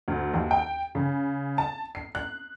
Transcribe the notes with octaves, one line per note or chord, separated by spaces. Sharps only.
D2
D#2
G5
C#3
A5
C7
F#6